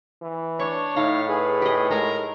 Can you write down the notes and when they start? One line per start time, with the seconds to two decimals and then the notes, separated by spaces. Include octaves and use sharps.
0.22 E3
0.59 D4 C#5 C#6
0.96 A2 D#4 F5
1.29 G#4 B4
1.62 G4 D#5
1.90 G#3 G#4 A#4 A#5